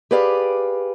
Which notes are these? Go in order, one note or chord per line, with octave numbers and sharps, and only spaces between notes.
G4 G#4 B4 D5 F5